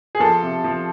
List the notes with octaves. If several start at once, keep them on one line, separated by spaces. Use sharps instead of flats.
G#4
F3 A4
C3
F3